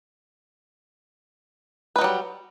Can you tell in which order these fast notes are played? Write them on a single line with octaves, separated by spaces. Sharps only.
B4 D#4 F#3 G3